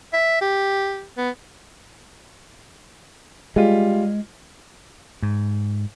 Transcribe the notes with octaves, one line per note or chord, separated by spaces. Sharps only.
E5
G4
B3
G3 G#3 F4
G#2